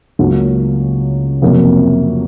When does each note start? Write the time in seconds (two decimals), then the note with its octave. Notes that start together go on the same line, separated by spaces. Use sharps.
0.19 C#2 C#3 F#3 A#3
1.42 F2 C3 F#3 A#3